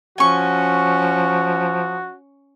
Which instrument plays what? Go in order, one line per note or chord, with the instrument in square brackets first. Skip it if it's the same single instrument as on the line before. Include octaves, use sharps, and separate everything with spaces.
[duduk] F3 [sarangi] C#4 [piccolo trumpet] F#4 [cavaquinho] G#5 C#6